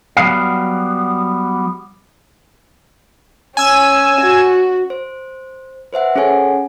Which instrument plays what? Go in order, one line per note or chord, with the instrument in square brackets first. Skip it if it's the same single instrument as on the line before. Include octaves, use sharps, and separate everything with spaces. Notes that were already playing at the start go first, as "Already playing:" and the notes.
[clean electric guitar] F#3 G3 B3 F5
[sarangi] C#4 [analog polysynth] G#5 E6
[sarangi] F#4
[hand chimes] C5
B4 C5 E5 F#5
C#4 G#4 A4 C#5 F#5 G#5